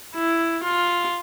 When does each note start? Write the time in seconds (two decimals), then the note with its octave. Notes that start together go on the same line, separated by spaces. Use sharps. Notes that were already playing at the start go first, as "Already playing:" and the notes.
0.15 E4
0.63 F4